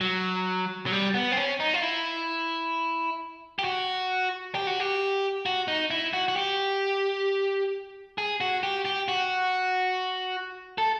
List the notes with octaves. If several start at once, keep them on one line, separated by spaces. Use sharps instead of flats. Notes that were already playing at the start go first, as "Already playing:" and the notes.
F#3
F#3
G3
B3
C4
C#4
D#4
F4
E4
G4
F#4
G4
F#4
G4
F#4
D#4
E4
F#4
F#4
G4
G#4
F#4
G4
G4
F#4
A4